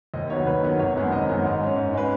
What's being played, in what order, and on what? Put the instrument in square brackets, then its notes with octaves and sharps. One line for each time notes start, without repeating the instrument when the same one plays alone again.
[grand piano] D#2 D#5
D#3 F#3 B3 C#5
D#2 B4
D#3 F#3 B3
G#1 C#5
F#2 D#3 G#3 B3
G#1 D#5
F#2 D#3 G#3 B3
G#2
G#3 C#4
G#2
G#3 C#4 B4